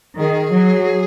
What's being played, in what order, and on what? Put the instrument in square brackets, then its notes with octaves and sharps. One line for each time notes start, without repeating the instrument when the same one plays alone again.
[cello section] D#3 [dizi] G#4
[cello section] F#3